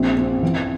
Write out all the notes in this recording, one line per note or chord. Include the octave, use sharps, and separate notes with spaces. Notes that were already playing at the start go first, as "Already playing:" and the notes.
Already playing: A#1 C4
C4
E3